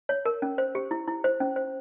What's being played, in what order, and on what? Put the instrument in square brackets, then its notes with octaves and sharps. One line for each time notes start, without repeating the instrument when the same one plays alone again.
[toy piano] C#5
A#4
C#4
C5
G4
E4
E4
C5
C#4
C5